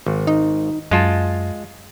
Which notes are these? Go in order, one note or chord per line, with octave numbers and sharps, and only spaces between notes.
G#1
D#4
F#2 G#3 F4 A5